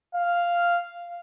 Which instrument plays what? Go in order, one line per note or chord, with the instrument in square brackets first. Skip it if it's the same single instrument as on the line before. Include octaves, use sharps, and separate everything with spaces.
[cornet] F5